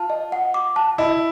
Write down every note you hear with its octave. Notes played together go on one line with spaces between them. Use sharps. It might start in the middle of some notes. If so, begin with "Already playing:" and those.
Already playing: F4 A5
D#5
F#5
D6
A5
E4 D#5